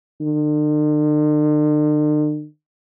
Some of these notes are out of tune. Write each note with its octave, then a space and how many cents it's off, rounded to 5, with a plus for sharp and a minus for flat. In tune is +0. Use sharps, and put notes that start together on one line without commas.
D3 +45